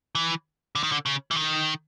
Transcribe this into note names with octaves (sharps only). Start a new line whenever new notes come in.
E3
D3
D#3
D3
C#3
E3
D#3